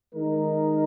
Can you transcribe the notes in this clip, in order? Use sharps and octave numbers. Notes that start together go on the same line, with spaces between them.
D#3 G#3 D#4 A#4